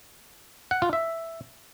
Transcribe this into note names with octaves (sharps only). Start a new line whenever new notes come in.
F#5
F4
E5